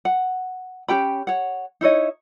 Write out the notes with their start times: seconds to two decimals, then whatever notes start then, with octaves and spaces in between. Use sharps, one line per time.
0.05 F#5
0.88 C#4 G4 G5 B5
1.27 C#5 F#5
1.81 D#4 E4 C#5 D#5